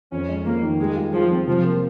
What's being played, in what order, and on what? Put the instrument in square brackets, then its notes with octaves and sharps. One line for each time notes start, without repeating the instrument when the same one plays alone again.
[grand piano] F2 [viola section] C#4
[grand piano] G#3
[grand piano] F2 [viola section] A#3
[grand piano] D#3
[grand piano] G3 [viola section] G#3
[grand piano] F4
[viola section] F3 [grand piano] G#4
[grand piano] C4
[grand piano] C3 [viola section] F3
[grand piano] A#3